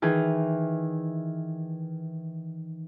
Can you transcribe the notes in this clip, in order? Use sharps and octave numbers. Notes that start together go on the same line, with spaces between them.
D#3 E3 G#4